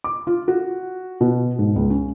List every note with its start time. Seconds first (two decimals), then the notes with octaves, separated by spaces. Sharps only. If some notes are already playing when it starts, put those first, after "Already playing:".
0.04 D6
0.27 F4
0.48 F#4
1.21 B2
1.59 G#2
1.76 C#2
1.90 C#4